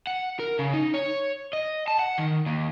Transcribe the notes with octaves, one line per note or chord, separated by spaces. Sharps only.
F#5
A#4
C#3
D#4
C#5
D#5
A5
F#5
D#3
D#2